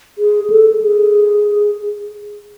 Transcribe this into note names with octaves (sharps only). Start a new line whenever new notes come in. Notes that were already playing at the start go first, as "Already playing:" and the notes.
G#4
A4
G#4